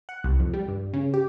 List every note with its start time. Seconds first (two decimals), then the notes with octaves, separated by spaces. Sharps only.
0.09 F#5
0.24 C2
0.40 F2
0.53 G3
0.68 G2
0.93 C#3
1.14 G4